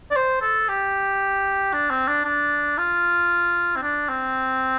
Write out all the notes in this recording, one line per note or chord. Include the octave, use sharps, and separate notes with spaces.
D5
C5
A4
G4
D4
C4
D4
D4
F4
C4
D4
C4